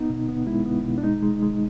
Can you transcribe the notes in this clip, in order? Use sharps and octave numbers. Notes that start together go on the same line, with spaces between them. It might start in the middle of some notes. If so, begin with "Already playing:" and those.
Already playing: B3 D#4
B2
B3
G#3 E4
B3
B2
D4
G#3 D#4
G#3
G#3